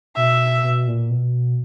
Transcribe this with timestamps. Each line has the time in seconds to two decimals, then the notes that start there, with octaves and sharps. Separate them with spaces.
0.16 B2 E5
0.63 B2
0.87 A#2
1.10 B2